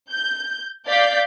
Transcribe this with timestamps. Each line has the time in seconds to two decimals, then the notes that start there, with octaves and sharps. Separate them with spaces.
0.11 G6
0.88 D5 F5 G6 B6